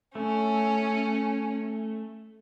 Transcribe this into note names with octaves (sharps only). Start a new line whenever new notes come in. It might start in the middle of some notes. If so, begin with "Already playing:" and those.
A3 C#4